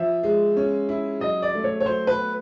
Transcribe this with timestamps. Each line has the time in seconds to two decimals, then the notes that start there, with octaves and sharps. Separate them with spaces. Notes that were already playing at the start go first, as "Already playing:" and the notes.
Already playing: F3 E5
0.23 G#3
0.57 C#4
0.89 E4
1.20 F#3 D#5
1.42 D5
1.54 A3
1.64 C#5
1.80 C#5
1.86 F#3 C5
2.07 B4
2.19 B3